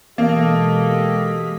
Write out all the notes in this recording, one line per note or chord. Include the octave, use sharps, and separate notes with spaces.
B2 E3 G#3 A#3 G4 A4 D#5 B6